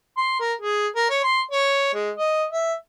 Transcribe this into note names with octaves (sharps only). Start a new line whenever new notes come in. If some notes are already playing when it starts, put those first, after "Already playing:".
C6
A#4
G#4
A#4
C#5
C6
C#5
G#3
D#5
E5